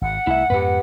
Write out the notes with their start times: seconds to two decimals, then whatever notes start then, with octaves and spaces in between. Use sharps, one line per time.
0.01 G#1 F#5
0.27 C2 A3 E4 E5
0.50 F2 G#2 B3 G4 B4